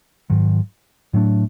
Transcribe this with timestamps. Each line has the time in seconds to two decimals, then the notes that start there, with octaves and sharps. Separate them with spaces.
0.30 G#2 D#3 F#3
1.13 A2 F#3 A3 D4